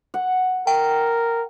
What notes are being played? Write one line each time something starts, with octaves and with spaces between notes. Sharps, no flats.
F#5
A#4 G5